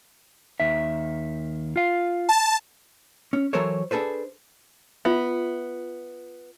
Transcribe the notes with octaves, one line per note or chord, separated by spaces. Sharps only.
D#2 D#3 E5
F4 F5
A5
C#4
E3 F#3 A4 A#4 C5 C#5
D4 G#4 A4 B4 C5
B3 F4 E5